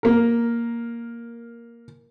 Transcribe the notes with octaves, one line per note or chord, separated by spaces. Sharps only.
A#3 A#4